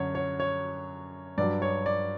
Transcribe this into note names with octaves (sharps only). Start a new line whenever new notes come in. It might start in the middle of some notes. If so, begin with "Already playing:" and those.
Already playing: F#2 D3 F#3 C#5
C#5
C#5
G2 F#3 D5
C#5
D5